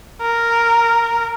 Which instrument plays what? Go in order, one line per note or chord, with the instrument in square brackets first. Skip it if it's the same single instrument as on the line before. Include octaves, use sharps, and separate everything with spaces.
[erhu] A#4